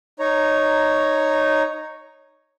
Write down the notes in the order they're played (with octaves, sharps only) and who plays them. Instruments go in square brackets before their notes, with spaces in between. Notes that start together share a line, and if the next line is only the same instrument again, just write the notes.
[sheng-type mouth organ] D#4 C#5 A#5